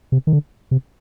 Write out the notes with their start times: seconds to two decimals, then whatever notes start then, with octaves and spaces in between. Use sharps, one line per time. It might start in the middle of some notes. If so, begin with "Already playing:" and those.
0.12 C3
0.27 D#3
0.33 D3
0.71 C3